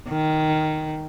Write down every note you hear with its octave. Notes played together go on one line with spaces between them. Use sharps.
D#3